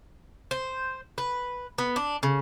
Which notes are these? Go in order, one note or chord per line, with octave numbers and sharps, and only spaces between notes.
C5
B4
B3
D4
C#3